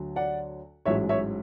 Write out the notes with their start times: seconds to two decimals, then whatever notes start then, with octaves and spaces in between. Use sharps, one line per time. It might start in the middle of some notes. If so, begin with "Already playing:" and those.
Already playing: D2 D3 F#3
0.16 D5 F#5
0.85 A1 G#2 F#3 C#5 E5
1.09 C#5 E5